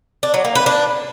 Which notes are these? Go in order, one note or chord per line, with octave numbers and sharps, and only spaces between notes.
D4
F#3
A#3
B4
D4